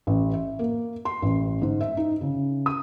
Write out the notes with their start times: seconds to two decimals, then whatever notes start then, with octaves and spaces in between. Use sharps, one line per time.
0.07 A1
0.33 E5
0.59 A#3
1.05 C6
1.22 A1
1.62 G#2
1.81 E5
1.97 D#4
2.21 C#3
2.66 D#6